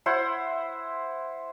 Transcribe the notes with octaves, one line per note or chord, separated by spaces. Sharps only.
E4 C5 F#5